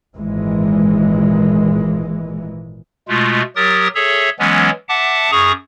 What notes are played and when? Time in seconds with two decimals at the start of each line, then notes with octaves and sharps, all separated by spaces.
0.17 G#1 A#2 E3 G#3
3.08 B2 G#3 A3 F4
3.56 F#3 G4 A#4 D#6 A6
3.95 G#4 A4 C#5 E5
4.39 E3 F#3 G#3 B3 C#4
4.89 E5 F#5 A5 D6
5.31 F#2 G#4 A#5 C#6 D#6